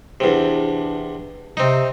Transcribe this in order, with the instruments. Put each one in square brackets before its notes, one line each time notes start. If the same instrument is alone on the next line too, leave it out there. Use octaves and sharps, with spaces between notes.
[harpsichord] E2 C3 [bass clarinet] D4
[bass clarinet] C3 [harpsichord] C4 D#4